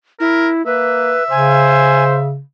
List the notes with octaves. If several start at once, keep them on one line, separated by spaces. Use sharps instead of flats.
E4 A#4
A#3 B4 E5
C#3 C5 G#5